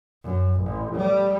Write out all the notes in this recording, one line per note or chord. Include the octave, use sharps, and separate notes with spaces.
F#2
A1
G3